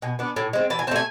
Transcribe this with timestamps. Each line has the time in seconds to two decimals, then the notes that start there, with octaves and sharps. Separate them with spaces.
0.02 B2 G#5
0.19 B3 D4
0.36 A2
0.53 G#3 C4
0.70 E3 A5
0.79 G#5
0.87 C4 A5
0.91 A3 G#5